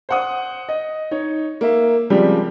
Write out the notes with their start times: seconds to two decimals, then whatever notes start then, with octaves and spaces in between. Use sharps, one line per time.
0.09 C5 F#5 D#6
0.69 D#5
1.11 D#4 C#5
1.61 A#3 E5
2.10 C#3 F3 G3 G#3 C4 G4